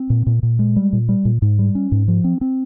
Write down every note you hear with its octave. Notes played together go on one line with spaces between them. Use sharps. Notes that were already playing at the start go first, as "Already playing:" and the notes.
Already playing: C4
A#2
A#2
A#2
G#3
G3
A#2
G3
A#2
G#2
G3
C#4
G#2
F3
C4
C4